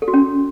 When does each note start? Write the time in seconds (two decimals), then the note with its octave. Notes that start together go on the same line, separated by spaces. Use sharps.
0.02 A4
0.08 F#4
0.14 C#4